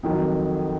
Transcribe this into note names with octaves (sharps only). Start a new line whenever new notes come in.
F2 D#3 F#3